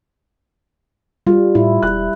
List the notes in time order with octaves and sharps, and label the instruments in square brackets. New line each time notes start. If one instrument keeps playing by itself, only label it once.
[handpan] G3 [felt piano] F4
[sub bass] A2 [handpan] E4
[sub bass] E1 [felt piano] F#6